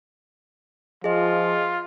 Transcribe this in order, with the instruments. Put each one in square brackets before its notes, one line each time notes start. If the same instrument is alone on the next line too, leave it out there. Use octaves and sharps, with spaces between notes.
[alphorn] F3 [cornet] F4 [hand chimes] G#4 D#5